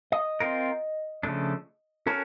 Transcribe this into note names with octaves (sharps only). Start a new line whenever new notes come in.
D#5
C4 F4 A#4
C#3 F3 A3 D4
C#4 F#4 A4 A#4